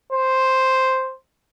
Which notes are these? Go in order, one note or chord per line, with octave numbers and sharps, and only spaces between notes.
C5